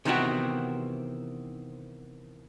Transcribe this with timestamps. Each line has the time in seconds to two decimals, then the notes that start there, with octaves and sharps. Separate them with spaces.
0.05 C3 D#3 E3 B3 C4 F#4